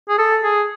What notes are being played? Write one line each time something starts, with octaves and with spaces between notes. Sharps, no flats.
G#4
A4
G#4